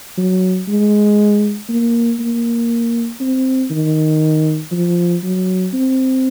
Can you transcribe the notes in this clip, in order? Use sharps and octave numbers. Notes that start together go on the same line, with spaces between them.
F#3
G#3
A#3
A#3
C4
D#3
F3
F#3
C4